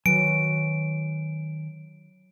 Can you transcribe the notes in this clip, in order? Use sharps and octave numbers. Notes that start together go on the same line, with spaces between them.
D#3 F#3 B4 G#5 D7